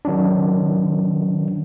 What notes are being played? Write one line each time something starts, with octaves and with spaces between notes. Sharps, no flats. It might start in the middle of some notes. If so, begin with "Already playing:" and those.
D#3 F#3 C#4 D4